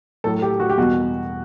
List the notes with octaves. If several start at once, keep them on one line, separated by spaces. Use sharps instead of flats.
A2 F#3 A3 A4
G4
F#4
G4
E2 B2 G3 F#4